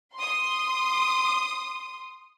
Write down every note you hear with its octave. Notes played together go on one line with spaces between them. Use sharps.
C6 D#6